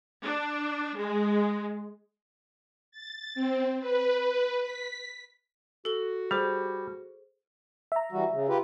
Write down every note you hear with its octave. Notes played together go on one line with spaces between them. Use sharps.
D4
G#3
A6
C4
B4
B6
F#4 A4 G7
G3 G#4 C5
E5 A#5
E3 G3 F#4
C#3
F4 G4 B4